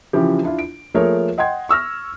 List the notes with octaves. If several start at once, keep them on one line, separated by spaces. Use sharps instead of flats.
C#3 E3 F3 G4
D4 E4 F4
D7
F3 A3 A#3 G#4 A#4 C#5
D#5 F#5 G5 C6 G#6
C#6 E6 F6 A#6